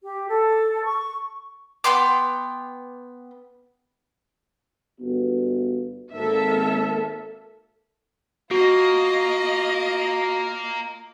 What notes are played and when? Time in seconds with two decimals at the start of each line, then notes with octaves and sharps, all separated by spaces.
0.03 G4
0.29 A4
0.85 C#6
1.84 B3 G5 C6 D6
5.01 G1 B3 F#4
6.13 G#1 A#3 A4 E5
8.51 A#3 F4 F#4 D#5